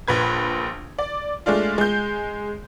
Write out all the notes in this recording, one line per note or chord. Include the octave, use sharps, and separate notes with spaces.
A#1 A#2 B4 G#6
D5
G#3 A3 D4 F4
G#3 G6